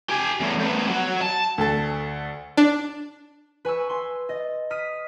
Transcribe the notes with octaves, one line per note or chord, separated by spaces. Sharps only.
G4 G#5
E2 A2
A3 B3
F#3 F#4
A5
D2 A4
D4
B4 G#5 C#6 E6
G#5 C6
D#5 A6
D#6 F6 B6 D#7